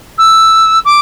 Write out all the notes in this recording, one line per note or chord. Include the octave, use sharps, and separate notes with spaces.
E6
D6